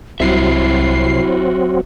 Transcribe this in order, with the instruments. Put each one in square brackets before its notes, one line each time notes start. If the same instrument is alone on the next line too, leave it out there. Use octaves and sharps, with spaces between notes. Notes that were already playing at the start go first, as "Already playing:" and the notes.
[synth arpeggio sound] C2 C7 [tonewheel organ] F#3 C4 [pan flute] E4 [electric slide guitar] F#4 G4 E5